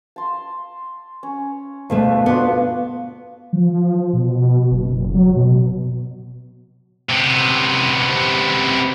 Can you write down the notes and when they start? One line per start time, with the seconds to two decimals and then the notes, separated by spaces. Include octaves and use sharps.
0.16 A5 C6
1.23 C#4
1.90 D2 B2 A3 F5
2.26 B3 D4 F4 F#4
3.53 F3
4.13 B2
4.72 F#1
5.14 F#3
5.36 B2
7.09 C3 B3